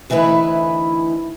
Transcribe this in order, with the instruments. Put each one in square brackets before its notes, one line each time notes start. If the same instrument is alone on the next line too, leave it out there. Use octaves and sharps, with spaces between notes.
[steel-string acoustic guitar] D2 E3 D#4 E4 B4